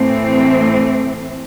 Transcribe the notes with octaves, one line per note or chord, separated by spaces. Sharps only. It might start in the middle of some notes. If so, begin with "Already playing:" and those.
Already playing: A2 E3 A3 C4